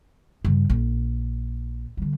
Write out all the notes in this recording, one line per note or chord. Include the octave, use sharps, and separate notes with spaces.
G2 C#3
A#1
D3 G3